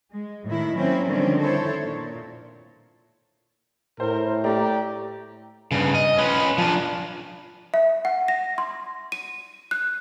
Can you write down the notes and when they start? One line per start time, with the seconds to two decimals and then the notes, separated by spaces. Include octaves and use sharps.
0.11 G#3
0.46 A2 D#3 E4
0.75 F#3 A#3 C4 C#4 E4
1.06 D3 D#3 F3 G3 C4 C#4
1.40 E4 A4 C5 C#5
1.81 A#2
4.00 A2 A#4 C5
4.44 A3 G4 D5 A#5
5.71 G2 C#3
5.95 D#5
6.18 C#4 B4
6.58 F3 D4
7.74 E5
8.05 F#5
8.28 A#6
8.58 C6
9.12 D#7
9.71 F#6